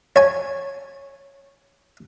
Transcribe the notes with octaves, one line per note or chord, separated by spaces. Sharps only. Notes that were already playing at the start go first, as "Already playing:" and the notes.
C#5 G#5